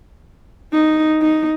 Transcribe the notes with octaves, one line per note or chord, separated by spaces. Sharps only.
D#4
D#4